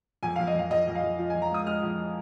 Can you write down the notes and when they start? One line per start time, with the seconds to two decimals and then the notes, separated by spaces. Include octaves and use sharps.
0.23 F2 G#5
0.36 F2 F5
0.47 D#5
0.54 F2 F5
0.70 F2 D#5
0.87 F2
0.95 F5
1.02 F2
1.18 F3
1.30 F2 G#5
1.42 A#5
1.51 G#3 D#6
1.67 G#3 F6
1.82 F2